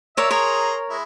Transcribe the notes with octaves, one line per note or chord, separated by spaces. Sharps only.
A#4 C#5 D5 E5 E6
G#4 A#4 C#5 A#5 C6
G#3 E4